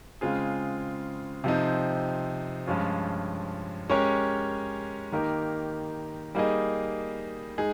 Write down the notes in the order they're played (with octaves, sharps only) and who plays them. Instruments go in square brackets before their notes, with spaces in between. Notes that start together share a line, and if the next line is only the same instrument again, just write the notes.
[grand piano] C#3 G#3 C4 F4 G#4
C3 F3 C4 D#4
G2 F3 G#3 C#4 F4
G#3 C#4 G4 A#4 C#5
D#3 A#3 D#4 G4 A#4
G3 A#3 D#4 G#4 D#5
G#3 D#4 G#4